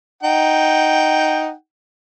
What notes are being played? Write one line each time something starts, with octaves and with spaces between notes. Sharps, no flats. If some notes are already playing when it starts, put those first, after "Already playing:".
D#4 F#5 G5